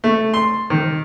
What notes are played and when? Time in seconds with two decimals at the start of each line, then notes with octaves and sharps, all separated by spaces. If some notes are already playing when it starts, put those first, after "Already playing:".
0.04 A3
0.34 C6
0.70 D#3